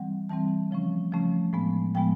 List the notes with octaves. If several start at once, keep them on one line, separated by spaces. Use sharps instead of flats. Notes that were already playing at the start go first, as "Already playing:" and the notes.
Already playing: E3 G3 C4 F#5
E3 G3 C4 A5
C#3 F3 A3 C#4
C#3 F3 A3 C#4
A2 F3 G#3 B3
A2 F3 G#3 B3 G5